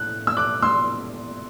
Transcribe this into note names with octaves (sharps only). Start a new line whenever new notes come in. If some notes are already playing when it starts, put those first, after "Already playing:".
Already playing: A2 F#6
E6
D6 F#6
C6 E6